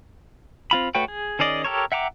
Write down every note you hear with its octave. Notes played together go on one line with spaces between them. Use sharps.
C4 F4 B5
A3 F#4 B4 C#5 G5
G#4
D#3 C#4 G#4 D5 D#5
G4 A4 A#4 C#5
E5 F#5 G5 A#5 D6